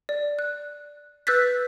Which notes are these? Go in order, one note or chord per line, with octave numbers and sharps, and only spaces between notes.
D5
F#6
B4 E6 F#6 G6 A6 B6